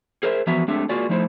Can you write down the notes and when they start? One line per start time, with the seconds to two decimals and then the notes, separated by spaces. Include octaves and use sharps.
0.23 G#4 A#4 C5 D#5 E5
0.47 E3 F3 B3 F#4 E5 A#5
0.68 G#3 A3 C4 D4 G4 E5
0.89 G#3 A#3 F4 F#4 D5 G#5
1.09 F3 A3 D#4 E4 C5